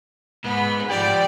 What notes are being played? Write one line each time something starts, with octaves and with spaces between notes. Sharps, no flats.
G#2 B3 B5
F3 G3 D5 G5